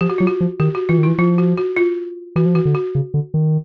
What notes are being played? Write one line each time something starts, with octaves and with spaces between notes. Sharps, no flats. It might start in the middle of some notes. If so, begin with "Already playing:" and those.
F3 G4
F#4
F#3 F4
F#4
F3
D#3 G4
F#4
E3 F4
D#3
E4
E3
F3 F4
F#4
F#4
F4
E3 F#4
F3
E3 F#4
D3
F#4
C#3
D3
D#3